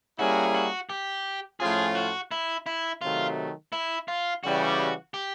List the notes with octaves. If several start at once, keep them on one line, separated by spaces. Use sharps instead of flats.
G3 A#3 C#4 E4 F#4 G#4
F#4
G4
A2 F3 A3 C#4 F4 G#4
F#4
E4
E4
C3 D#3 F#3 A3 F4
E4
F4
C#3 E3 G3 F#4
G4